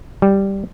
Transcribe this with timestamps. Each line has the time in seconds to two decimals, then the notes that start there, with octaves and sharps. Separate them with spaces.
0.22 G3